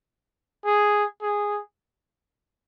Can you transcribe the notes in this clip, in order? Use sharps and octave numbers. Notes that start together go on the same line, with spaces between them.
G#4
G#4